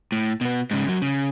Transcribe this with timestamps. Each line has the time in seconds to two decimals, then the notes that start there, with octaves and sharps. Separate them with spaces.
0.12 A2
0.41 B2 B3
0.71 G#2 C#3
0.86 F#2 F#3
1.02 C#3